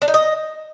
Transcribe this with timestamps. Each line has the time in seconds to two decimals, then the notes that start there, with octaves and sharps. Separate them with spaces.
0.02 D4
0.08 D#4
0.14 D#5